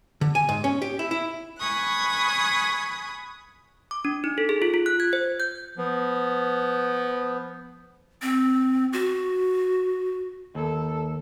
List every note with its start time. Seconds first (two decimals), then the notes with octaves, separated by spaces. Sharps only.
0.21 D3
0.35 G#5
0.49 G#2
0.64 C#4
0.82 G4
0.99 E4
1.11 E4
1.59 G#5 B5 C#6 D#6 F#6
3.91 D6
4.05 D4
4.24 D#4
4.38 A4
4.49 G#4
4.62 F4
4.74 F4
4.86 F#6
5.00 G#6
5.13 C5
5.40 G6
5.78 F3 B3
8.22 C4
8.93 F#4
10.55 D#2 A4